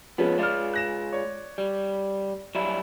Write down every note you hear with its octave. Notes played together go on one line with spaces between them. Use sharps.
F3 G#3 B3 C#4
G#3 F4 D5 F6
F#6 A#6 E7
C#5 D5
G3
F#3 G3 E4